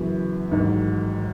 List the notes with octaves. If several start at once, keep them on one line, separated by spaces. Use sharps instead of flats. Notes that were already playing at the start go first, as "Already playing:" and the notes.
Already playing: F#2 C#3 E3 B3 F#4
A1 G#2 D#3 F#3